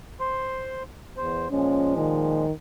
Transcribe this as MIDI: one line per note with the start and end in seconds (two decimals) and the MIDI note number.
0.20 0.83 72
0.20 0.83 84
1.17 1.48 40
1.17 1.48 72
1.51 2.46 46
1.51 2.46 53
1.51 2.46 56
1.51 1.95 61
1.97 2.52 51